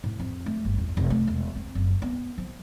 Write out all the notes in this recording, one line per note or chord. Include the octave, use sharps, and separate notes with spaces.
A2
F2
A3
G1
E2
F1
A3
E1
C4
F#1
B3
F3